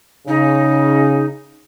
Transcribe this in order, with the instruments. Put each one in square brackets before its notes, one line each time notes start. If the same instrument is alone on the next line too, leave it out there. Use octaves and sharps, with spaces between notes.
[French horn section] C#3 [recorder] D#4